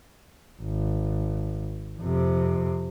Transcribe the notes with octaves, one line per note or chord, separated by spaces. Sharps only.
G#1
F2 C3